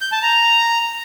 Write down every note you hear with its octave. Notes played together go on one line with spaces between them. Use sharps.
G6
A5
A#5